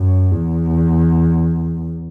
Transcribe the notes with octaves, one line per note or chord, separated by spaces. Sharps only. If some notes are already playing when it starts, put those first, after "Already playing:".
Already playing: F#2
E2